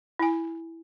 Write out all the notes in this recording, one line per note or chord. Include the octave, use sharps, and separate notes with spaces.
E4 G#5